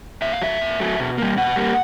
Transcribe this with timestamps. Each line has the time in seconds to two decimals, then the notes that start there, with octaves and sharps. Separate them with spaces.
0.22 A#2 E5
0.33 F5
0.42 F#3 A3 E5
0.61 A#2
0.80 F#3 A3
1.00 B2
1.18 G3 A#3
1.37 B2 F#5
1.56 G3 A#3